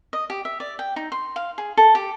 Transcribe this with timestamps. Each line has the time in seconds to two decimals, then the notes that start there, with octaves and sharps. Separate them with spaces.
0.13 D#5
0.30 G4
0.45 E5
0.60 D5
0.79 G5
0.96 D#4
1.12 C6
1.36 F5
1.58 G#4
1.77 A4
1.95 G4